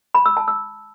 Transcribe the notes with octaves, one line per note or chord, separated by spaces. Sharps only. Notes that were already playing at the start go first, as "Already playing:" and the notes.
B5
E6
A5
E6